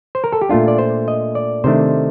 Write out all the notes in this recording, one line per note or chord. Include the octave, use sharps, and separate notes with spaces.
C5
A#4
A4
G4
A#2 A3 D4 F4
D5
C5
D#5
D5
C3 D#3 A3 D4 C5